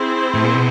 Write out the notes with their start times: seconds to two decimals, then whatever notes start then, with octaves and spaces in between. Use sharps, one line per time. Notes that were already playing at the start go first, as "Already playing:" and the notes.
Already playing: C4 E4 G#4 C5
0.34 A2
0.44 A#2
0.54 B2